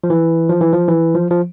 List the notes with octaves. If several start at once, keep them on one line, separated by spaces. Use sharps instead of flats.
F3
E3
F3
E3
F3
E3
F3
F3